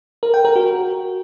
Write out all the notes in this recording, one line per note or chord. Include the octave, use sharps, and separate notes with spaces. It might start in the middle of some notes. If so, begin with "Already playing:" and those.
A#4
G5
A#4
F#4